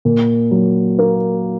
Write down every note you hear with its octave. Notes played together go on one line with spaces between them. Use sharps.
A#2
F#3
A#3